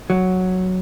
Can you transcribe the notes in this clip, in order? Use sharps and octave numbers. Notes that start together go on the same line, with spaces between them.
F#3